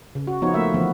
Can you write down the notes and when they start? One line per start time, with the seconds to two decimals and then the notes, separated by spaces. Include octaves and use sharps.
0.15 C#3
0.27 F#4
0.42 F3 B3 D#4 F4 F#4 C#5
0.54 A3 A#3 E5
0.74 D3 E3 F3 B3